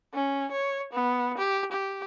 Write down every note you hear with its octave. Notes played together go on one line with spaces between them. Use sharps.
C#4
C#5
B3
G4
G4